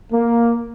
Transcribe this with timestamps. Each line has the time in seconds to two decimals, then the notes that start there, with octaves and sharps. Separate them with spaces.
0.13 A#3